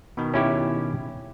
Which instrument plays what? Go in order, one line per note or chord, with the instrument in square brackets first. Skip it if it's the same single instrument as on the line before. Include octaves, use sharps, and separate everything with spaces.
[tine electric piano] B2 D#3
[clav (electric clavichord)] C#4 E4 G4